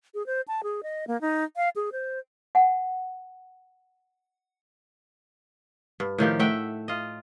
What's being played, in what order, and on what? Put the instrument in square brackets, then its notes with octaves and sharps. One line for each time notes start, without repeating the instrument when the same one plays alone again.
[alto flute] G#4
C5
A5
G#4
D#5
A#3
D#4
F5
G#4
C5
[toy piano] F#5 G#5
[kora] G2
A2 D#3 F3 G4
A3 E5 F#5 G5
F4 D#5